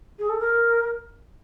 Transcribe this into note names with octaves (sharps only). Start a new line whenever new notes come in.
G#4
A4
A#4